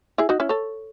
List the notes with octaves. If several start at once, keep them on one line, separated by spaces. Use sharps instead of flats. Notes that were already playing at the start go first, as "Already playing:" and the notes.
E4 G#4
D#4 F#4
C#4 E4
A4 C#5